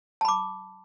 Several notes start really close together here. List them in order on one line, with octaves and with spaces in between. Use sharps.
A5 B5 D6